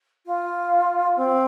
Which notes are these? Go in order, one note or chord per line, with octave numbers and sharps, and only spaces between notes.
F4
C4